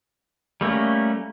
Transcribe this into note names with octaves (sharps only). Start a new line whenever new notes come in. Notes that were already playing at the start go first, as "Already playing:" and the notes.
G3 A3 A#3 C#4